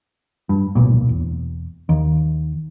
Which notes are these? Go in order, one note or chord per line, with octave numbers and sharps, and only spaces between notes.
G2
D1 B1 A#2
E1
D#2